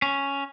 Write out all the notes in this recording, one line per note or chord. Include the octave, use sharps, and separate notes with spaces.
C#4